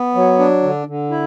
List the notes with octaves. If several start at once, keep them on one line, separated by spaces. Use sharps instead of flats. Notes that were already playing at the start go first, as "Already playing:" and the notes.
Already playing: B3
F#3
D4
D3
D3
E4